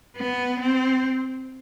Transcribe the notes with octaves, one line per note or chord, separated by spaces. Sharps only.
B3
C4